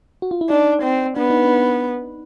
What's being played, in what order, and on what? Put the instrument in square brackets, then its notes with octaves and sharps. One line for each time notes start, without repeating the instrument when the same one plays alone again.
[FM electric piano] F#4
F4
E4
[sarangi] D4 [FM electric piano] D#4
[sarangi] C4
[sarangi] B3 [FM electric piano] D4
[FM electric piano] D#4
D4